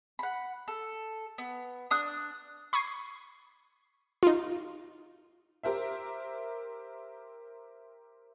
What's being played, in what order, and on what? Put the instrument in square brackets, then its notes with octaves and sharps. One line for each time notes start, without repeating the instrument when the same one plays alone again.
[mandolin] F#5 B5
A4
B3
D4 D#6 F#6
[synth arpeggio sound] B5 C#6 D#6 G#6 C7
D#4 F4
[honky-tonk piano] G4 A#4 C5 E5